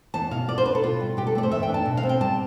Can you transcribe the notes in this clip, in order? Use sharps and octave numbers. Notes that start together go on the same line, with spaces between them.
E2 A5
B2 F5
F4 D5
C5
D4 B4
A4
B2 F4
G3
B2 G4
A4
A3 D5
C5
E2 E5
G5
D4
A5
B2
F5
C4
G5
G3 A5